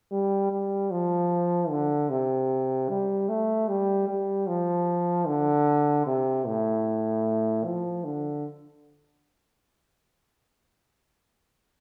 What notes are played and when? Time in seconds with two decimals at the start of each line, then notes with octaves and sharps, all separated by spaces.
0.11 G3
0.51 G3
0.91 F3
1.70 D3
2.09 C3
2.89 G3
3.29 A3
3.68 G3
4.08 G3
4.47 F3
5.27 D3
6.06 C3
6.46 A2
7.65 F3
8.04 D3